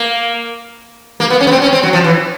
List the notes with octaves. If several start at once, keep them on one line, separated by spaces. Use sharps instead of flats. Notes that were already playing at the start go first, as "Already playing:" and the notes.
Already playing: A#3
A#3
B3
C#4
B3
C4
C#4
C4
F#3
F3
E3